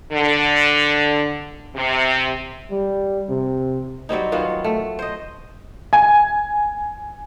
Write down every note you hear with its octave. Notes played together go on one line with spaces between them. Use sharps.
D3
C3
G3
C3
F#3 G3 C4 D#4
D#3 F#3 B3 F4
A3
C5 D#5
G#5